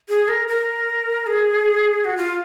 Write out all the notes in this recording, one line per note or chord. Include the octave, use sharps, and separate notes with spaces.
G#4
A#4
A#4
G#4
F#4
F4